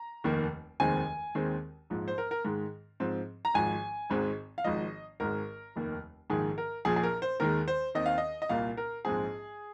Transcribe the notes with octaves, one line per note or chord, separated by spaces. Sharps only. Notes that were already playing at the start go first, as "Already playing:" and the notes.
Already playing: A#5
F1 D#2 D#3 A#3
F1 D#2 D#3 G#3 C4 G#5
D#2 D#3 G#3 C4
A#1 G#2 F3
C5
A#4
A#4
G#2 D#3 G#3
G#2 F3 C4
A#5
G#1 G#2 F3 G#5
G#1 G#2 G#3 C4
F5
G#1 G#2 F3 D#5
G#1 G#2 G#3 A#4
F1 D#2 D#3 A#3
A#1 G#2 D#3 G#4
A#4
A#1 A#2 F3 G#4
G#4
A#4
C5
D#2 D#3 G#3 A#4
C5
D#2 D#3 C4 D#5
F5
D#5
D#5
C2 A#2 A#3 F5
A#4
A#1 G#2 G#3 C4 G#4